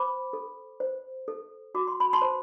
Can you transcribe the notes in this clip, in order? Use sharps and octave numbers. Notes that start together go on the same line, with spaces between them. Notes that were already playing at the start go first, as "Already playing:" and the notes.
Already playing: C5 B5 D6
A4
C5
A4
F#4 D6
C6
B5
A5 C6
C5